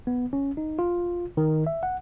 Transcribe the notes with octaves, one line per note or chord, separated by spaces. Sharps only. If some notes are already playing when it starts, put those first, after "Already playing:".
B3
C#4
D#4
F4
D#3
E5
F#5